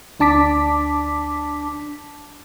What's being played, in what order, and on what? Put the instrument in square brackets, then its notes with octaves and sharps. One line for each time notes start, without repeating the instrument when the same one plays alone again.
[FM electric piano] D2 D4 A5 D6 B6